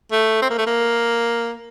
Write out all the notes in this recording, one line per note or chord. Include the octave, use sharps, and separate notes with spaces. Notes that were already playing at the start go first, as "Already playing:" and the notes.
A3
C4
A#3
A3
A#3